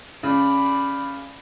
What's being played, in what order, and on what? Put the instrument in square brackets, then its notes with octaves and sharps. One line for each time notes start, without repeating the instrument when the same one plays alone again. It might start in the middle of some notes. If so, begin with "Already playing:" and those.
[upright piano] C#3 [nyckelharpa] D5 B5